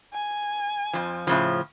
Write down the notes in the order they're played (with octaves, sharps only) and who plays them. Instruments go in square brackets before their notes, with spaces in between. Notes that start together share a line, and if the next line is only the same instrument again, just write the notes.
[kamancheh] G#5
[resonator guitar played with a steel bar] F2 G#2 F3
A2 C#3 F3